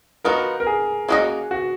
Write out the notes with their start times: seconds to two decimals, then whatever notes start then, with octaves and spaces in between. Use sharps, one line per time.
0.24 F3 B3 D#4 F#4 A#4
0.60 A#4
0.67 G#4
1.08 A#3 C#4 F#4 G#4 A#4 D#5
1.51 F#4